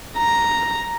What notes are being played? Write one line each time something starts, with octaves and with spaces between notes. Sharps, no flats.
A#5